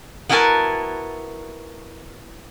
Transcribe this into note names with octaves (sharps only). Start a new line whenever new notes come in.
B3 E4 F#4 A#4 G#5 A5